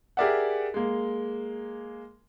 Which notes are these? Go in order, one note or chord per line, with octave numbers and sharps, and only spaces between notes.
G4 G#4 A#4 D5 E5 F#5
G#3 A#3